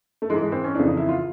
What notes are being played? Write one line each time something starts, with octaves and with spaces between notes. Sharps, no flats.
A3
G#2 E3 G#3
G#3
C4
C#4
F2 C#3 E3 D4
D#4
E4
F4